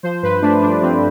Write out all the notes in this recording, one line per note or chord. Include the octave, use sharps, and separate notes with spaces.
F3 C5
G2 B4
A3 D4
G2 D4
F3 C4